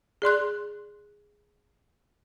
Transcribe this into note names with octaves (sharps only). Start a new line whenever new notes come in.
G#4 D5 C6 F#6